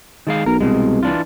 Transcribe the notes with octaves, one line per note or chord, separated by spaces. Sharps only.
D#3 G#3 F5
B1 A#4
C2 B2 G#3
E3 D4 F4